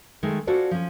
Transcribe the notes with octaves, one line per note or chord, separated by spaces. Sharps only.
D#3 G#3 A3
C#4 F4 F#4 A4 C5 D5
F3 C#4